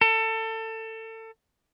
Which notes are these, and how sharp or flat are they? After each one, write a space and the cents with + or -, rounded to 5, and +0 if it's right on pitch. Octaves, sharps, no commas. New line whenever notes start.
A4 +25